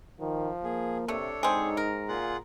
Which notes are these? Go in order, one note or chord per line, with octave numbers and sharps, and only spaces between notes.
D#3 F3
A#3 G#4
C3 A3 D4 A4 C#5
G#2 C4 D#4 G#4
A#4
A#2 F4 G#4 F#5